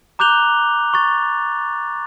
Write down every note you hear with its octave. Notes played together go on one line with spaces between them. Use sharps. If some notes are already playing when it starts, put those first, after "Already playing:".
A#5 D6 F#6 G6 F7 G7
C#6 A6